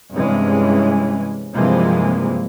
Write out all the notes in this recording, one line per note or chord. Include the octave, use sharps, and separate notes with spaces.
G2 C3 E3 G#3 C#4
G2 C3 E3 F3 G#3 A#3